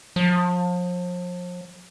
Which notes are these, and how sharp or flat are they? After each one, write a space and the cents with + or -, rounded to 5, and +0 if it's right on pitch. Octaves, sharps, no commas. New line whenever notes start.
F3 +35